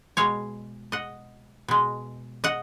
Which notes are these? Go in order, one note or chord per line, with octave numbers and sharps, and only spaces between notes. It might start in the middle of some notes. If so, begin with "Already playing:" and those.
B2 G#3 C#5 F5
D#5 F#5
B2 G#3
D#5 F#5